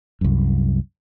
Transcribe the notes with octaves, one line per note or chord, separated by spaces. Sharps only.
C2 F#2